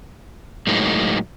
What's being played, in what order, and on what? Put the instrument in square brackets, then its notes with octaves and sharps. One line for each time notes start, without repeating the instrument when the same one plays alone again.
[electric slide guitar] A2 F#3 G#3 A#3 D#4